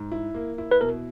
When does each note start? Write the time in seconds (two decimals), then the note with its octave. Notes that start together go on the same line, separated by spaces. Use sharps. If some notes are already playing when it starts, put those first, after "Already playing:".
Already playing: G#2
0.12 E4
0.35 A#3
0.58 E4
0.71 B4
0.81 B2 A#4